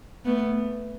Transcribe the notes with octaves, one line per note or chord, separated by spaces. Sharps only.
A3 B3